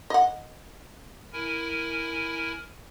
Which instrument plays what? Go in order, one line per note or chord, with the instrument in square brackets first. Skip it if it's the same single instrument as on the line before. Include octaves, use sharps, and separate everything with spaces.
[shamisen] D#5 F#5
[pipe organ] E4 A#4 G#5